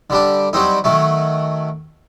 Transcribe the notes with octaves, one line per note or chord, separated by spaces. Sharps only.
D3 G3 D4
F#3 G3 C4 D#4
D#3 F#3 A3